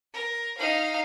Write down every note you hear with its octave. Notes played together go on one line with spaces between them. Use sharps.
A#4
D#4 F5